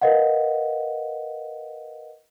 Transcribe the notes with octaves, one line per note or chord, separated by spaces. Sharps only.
A#4 B4 D#5 F5 F#5